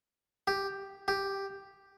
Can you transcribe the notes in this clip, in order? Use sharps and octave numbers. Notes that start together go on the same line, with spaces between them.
G4
G4